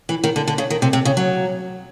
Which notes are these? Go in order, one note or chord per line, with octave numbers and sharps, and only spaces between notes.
E3
D#3
D3
D3
C#3
D#3
C3
C3
C#3
F#3